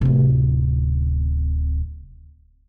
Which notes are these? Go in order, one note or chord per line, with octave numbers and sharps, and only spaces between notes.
D1 C3